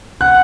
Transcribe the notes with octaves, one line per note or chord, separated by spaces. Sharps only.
F#5 F#6